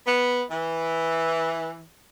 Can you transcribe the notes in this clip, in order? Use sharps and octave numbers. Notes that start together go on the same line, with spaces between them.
B3
E3